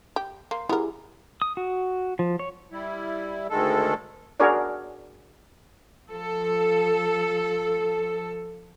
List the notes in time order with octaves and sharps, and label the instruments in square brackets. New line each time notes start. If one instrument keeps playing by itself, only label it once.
[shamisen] G4
[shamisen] A#3 [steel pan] C6
[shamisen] B3 A#4 [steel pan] E4 G4 G#4
[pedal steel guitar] D#6
F#4
F3
C#5
[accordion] G3 E4
D2 D#3 G#3 A4
[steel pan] D4 F#4 G#4 A#4 C#5 D5
[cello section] F3 A4